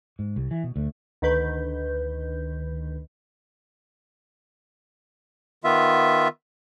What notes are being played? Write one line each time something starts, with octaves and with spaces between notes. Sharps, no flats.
G#2
C2
E3
B2
D2
D2 D#3 B4 G6
D#3 B3 F4 E5